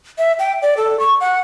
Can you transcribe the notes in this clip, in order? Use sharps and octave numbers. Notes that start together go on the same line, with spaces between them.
E5
G5
D5
A4
C#6
F#5